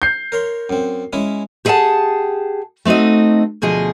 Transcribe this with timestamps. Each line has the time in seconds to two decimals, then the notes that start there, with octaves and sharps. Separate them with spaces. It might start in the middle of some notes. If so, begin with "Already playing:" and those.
0.02 G6 C7
0.32 A#4 C#5 C6
0.70 F#2 C4
1.13 G#3 C#4 E4
1.65 G4 G#4 D#5 E5 F#5 A5
2.85 A3 C4 D#4 F#4 D#5
3.62 D2 B2 F3 G#4 D#5